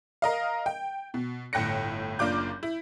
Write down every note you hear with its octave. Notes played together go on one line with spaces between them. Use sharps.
A#4 D#5 F5
G5
B2
G1 A2 G5 F#6 A#6 C#7
F#1 A#3 D4 F4 D6 G6
E4